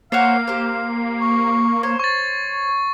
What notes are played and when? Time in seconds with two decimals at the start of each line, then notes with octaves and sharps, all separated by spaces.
0.12 A#3 C5 C#5 F5 F#5 C7
0.47 G4 C5
1.21 C#6
1.83 C5 C#5
1.99 C#5 C#6 A6